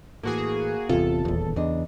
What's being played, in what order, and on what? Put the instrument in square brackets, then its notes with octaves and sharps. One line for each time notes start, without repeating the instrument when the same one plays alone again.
[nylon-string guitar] A2 E3 [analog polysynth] A#3 F#4 G#4
[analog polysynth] G1 A4 [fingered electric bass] E2 C3 [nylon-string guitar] F4
[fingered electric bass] D#1 E2
[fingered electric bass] E2 [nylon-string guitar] C#3 D4 D#5